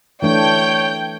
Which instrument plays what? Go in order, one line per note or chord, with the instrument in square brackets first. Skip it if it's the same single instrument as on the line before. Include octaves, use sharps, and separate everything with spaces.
[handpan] E3 A3 D4 [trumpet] C#5 [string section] G5 G6